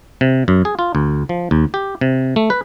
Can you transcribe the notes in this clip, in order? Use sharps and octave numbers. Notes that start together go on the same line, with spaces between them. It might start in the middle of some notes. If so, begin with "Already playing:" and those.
C3
F#2
G#4
F4
D2
F3
D#2
G4
C3
A3
B4